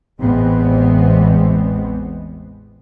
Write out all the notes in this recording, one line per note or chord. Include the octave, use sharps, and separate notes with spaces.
A1 E2 G#3 B3 C4